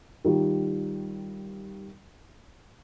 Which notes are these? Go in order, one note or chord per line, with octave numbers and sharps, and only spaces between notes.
D#3 G3 F4